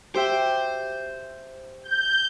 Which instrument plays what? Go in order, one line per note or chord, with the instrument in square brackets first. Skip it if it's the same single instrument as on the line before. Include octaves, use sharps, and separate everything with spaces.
[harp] G4 E5 G5 [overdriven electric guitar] C5
[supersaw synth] G6